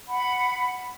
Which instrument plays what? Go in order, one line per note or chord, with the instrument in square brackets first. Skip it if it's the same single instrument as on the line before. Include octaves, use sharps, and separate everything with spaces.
[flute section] F#5 B5